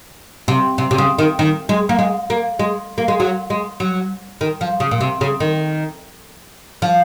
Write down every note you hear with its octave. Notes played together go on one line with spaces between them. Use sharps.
C3
C3
C3
C#3
D#3
D#3
G#3
A#3
G#3
A#3
G#3
A#3
G#3
F#3
G#3
F#3
D#3
F3
C#3
A#2
C3
C#3
D#3
F3